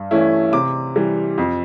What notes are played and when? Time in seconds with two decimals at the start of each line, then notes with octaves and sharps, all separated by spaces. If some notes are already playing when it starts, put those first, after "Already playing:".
Already playing: G2
0.11 E3 A3 C#4 E4
0.53 C3 D6
0.96 E3 G3
1.38 F2